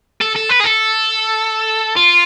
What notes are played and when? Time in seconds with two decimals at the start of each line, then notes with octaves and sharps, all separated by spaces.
0.21 A4
0.36 A4
0.50 B4
0.61 G#4
0.65 A4
1.96 F4